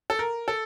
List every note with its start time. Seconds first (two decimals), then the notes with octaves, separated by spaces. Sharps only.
0.10 A4
0.19 A#4
0.48 A4